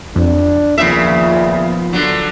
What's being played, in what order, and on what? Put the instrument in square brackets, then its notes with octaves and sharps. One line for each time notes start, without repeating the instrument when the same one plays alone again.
[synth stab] F2 [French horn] D4
[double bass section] D#2 F3 B3 [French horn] A#2 [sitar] C#3 E5
[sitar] D3 F#3